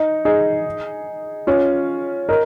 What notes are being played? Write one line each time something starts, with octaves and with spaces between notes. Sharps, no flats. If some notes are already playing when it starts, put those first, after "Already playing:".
Already playing: D#4
D#4 G#4
C#4 F4
A#4 D#5